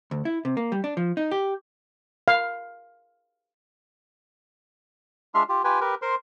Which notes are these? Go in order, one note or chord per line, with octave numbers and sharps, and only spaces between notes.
D2
E4
C3
A#3
G3
D4
F3
D#4
G4
F5
G#3 D4 F4 E5 C6 F6
F4 G4
F4 G4 B4 G5 G#5
G4 A#4 B4
A#4 C5 C6